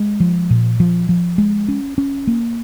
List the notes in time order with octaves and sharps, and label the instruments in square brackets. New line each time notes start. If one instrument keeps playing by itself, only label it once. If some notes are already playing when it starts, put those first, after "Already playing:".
Already playing: [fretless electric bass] G#3
F3
A#2
F3
F3
G#3
C#4
C#4
A#3